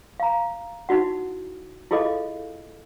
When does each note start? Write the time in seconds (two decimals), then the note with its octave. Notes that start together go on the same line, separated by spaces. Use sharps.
0.20 F5 A#5
0.89 D#4 E4 F#4 F#5
1.91 E4 F4 G#4 A4 D#5 F5